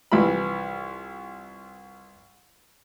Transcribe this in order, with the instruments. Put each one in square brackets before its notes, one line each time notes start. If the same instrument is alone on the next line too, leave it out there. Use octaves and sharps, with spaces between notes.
[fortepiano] C2 E3 F3 B5